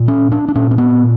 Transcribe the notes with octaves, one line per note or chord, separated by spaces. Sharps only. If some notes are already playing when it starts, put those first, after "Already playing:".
Already playing: A#2
C#4
D4
D4
A#2 C#4
C4
B3